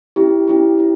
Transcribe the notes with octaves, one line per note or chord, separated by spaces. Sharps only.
C#4 E4 G4
C#4 E4 G4
C#4 E4